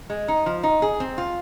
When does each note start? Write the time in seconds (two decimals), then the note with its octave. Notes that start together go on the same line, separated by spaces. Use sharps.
0.10 G#3
0.28 D#4
0.46 F3
0.63 D#4
0.82 G#4
1.00 C4
1.18 F4